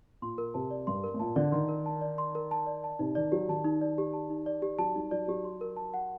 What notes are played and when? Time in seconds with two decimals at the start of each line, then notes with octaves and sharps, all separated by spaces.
0.22 A#2 C6
0.38 A#4
0.54 C3 A5
0.71 D5
0.87 G2 C6
1.04 A#4
1.14 A2
1.20 A#2 A5
1.36 D3 D5
1.52 D#3 C6
1.69 A#4
1.86 A5
2.01 D5
2.18 C6
2.35 A#4
2.51 A5
2.67 D5
2.84 A5
2.99 C3 D#4
3.15 D#3 D5
3.32 F#3 G4
3.48 D#3 A5
3.65 D#4
3.81 D5
3.98 G4
4.13 A5
4.30 D#4
4.46 D5
4.62 G4
4.79 F#3 A5
4.95 G3 D#4
5.11 F#3 D5
5.28 F#3 G4
5.44 C6
5.61 A#4
5.76 A5
5.94 F#5